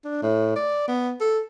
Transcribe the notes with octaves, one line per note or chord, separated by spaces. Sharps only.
D4
A2
D5
B3
A4